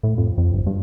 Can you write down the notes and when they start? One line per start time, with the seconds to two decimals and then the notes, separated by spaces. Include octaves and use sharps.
0.03 A2
0.18 F2
0.38 F2
0.53 G1
0.66 G2